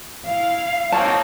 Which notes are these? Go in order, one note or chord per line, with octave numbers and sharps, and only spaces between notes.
E4 F5
A#3 C4 D#4 F#4 C#5 A5